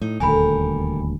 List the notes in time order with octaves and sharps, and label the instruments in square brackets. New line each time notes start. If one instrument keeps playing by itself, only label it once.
[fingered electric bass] A2 [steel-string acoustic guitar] D#4
[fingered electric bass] D#1 D2 [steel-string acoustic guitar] G4 A4 A#4 [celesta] G#5 B5